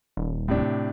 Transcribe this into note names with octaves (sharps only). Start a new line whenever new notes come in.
D#1
A2 C3 D4